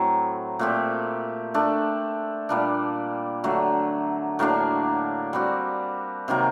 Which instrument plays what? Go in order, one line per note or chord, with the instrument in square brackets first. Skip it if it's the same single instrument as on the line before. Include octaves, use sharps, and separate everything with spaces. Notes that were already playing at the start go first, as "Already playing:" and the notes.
Already playing: [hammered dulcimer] A2 F#3 C4
A#2 A3 C4 G4
A3 D4 A4
A#2 G3 A#3 D4
D3 F#3 A3
A2 F#3 A#3 D4
G3 C4 F#4
C3 D#3 F#3 A#3